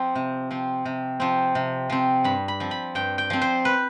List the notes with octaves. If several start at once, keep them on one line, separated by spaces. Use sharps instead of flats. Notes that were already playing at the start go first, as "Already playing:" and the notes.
Already playing: F3 C4
C3
F3 C4
C3
F3 C4
C3
F3 C4
G2 B5
B5
F3 C4
B5
G2 G5
G5
F3 C4
C5
B4